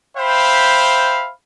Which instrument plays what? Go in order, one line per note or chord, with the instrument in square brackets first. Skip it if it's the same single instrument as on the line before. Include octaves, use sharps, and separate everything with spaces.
[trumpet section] C5 E5 F5 G5 B5